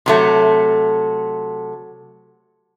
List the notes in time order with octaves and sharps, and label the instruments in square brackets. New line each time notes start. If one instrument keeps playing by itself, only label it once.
[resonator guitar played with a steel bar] C3 F#3 A3